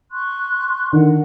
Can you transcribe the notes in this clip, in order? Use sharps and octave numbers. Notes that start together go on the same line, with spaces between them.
C6 C#6 F#6
D3 D#3 A#4 F#5